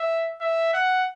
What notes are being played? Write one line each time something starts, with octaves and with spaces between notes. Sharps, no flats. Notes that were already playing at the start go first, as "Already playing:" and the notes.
Already playing: E5
E5
F#5